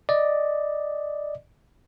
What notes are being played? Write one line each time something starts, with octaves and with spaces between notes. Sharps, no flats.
D5 D#5